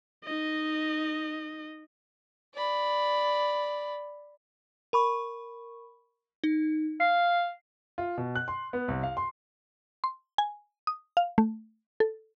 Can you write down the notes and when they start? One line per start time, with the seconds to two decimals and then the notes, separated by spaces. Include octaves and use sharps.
0.25 D#4 D#5
2.54 D5 B5
4.93 A#4 B5 C#6
6.44 D#4
7.00 F5 C7
7.98 F4
8.18 B2
8.36 F#6
8.48 C6
8.73 B3
8.88 C2
9.03 F5
9.17 C6
10.04 C6
10.38 G#5
10.87 D#6
11.17 F5
11.38 A3
12.00 A4